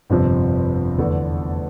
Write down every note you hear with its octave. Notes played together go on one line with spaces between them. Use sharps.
G1 F2 C3 F3
E2 D3 A3 D4 A4